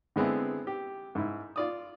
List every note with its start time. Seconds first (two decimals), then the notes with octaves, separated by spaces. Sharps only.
0.16 D3 G#3 B3 C4 E4
0.67 G4
1.15 G#2 E4
1.56 F4 D5 D#6